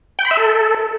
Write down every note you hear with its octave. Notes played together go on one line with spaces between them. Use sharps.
G5
B5
E5
A4